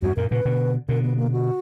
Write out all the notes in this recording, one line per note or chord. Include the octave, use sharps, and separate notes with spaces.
E2 G2 F#4
F#2 A#2 A#4
A#2 C#3 B4
B2 D3
B2 D3 A#4
B3
A#3
F#4